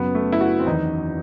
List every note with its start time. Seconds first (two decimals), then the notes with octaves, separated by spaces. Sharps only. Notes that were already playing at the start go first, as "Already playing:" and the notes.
Already playing: F#1 F#2 F#3 B3
0.15 A3
0.32 E4
0.41 F#4
0.59 C4
0.66 E2 D#3 F#3 D#4